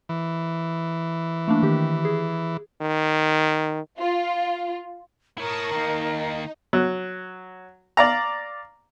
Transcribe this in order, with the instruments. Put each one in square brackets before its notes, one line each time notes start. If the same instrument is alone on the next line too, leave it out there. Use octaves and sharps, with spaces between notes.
[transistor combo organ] E3
[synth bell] A3 A#3 D4
D#3 G4
G#4
[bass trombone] D#3
[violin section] F4
[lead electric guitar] E4 C#5 [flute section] A#4 [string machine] A5 C#6 D#6
[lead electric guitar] D#3 A#3 [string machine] D#4
[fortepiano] F#3
D5 F5 A#5